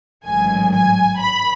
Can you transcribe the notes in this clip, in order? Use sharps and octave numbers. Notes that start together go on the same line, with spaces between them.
A1 G#2 D#3 F#3 G#5
G#5
B5